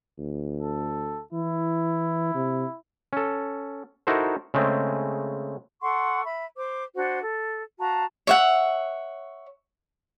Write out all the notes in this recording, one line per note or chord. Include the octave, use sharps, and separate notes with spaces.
D2
A4
E3 E4
C3
C#4 A4
D#4 E4 F#4 A4 A#4 C5
C#3 G#3 A3 C4
A4 F#5 C6 C#6
E5 B5
C5 D6
D4 F#4 C5 F#5
A4
F#4 F5 A5 A#5
C#5 E5 F#5